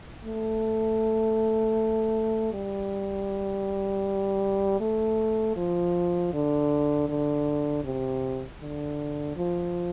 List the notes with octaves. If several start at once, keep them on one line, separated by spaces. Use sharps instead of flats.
A3
G3
A3
F3
D3
D3
C3
D3
F3